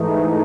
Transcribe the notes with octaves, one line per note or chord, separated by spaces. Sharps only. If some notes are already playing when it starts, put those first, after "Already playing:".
Already playing: G#2 E3 A3 D#4